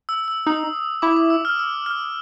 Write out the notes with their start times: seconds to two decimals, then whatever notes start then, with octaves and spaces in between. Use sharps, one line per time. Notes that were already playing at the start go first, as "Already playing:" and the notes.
0.09 E6
0.28 E6
0.46 D#4 D#6
1.02 E4 D6
1.16 D6
1.30 E6
1.45 F6
1.59 E6
1.86 F6